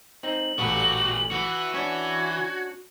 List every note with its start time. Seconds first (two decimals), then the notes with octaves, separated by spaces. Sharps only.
0.23 C4 D#4 F#7
0.59 A1 A#2 F#4 G4 A4 B4
1.31 E3 F#4
1.75 C#4 D4 F#4 G#6